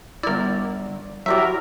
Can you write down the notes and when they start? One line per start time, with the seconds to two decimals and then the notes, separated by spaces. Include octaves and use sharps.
0.23 G1 E4 A#4 D5
1.26 F#3 E4 F#4 G4 A#4 D5 E5